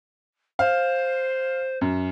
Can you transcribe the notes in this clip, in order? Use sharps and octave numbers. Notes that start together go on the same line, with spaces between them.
C5 F5
F#2